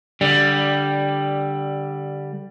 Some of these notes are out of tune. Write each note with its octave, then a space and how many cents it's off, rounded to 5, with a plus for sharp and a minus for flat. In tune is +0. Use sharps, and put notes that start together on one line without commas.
D3 -5 G3 +0